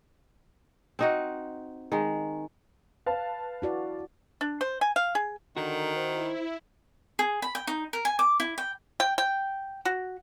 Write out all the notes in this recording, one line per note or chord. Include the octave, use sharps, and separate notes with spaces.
C4 D#4 F#4
D#3 G#3
B4 F5 A5
E4 F#4 D5
D4
C5
G#5
F5
G#4
D3 D#3 F#4 A#4
E4 C5
G#4
B5
G5
D#4
A#4
G#5
D6
E4
G5
G5
G5
F#4